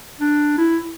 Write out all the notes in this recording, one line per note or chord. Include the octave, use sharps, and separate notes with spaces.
D4
E4